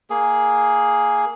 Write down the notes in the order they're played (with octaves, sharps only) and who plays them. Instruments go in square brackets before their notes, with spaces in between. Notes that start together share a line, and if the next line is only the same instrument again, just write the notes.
[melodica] A#3 G#4